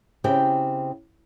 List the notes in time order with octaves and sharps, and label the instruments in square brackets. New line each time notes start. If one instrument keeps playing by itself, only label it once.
[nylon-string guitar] C#3 C4 E4 G4 G5